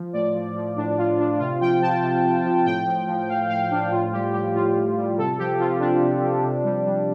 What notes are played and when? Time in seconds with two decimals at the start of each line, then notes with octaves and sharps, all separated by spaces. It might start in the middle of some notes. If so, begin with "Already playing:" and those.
Already playing: F3
0.13 A2 D5
0.34 F3
0.56 F3
0.76 A2 D4
0.98 A2 F4
1.18 F3 D4
1.39 C3 F4
1.61 F3 G5
1.81 F3 A5
2.02 C3
2.24 C3
2.44 F3
2.65 A2 G5
2.86 F3
3.07 F3
3.28 A2 F5
3.49 A2 F5
3.70 F3 D4
3.91 A2 F4
4.12 G3 G4
4.33 G3 G4
4.54 A2 F4
4.76 A2
4.97 G3
5.18 C3 A4
5.38 F3 G4
5.59 F3 F4
5.80 C3 D4
6.01 C3
6.22 F3
6.43 C3
6.64 G3
6.85 G3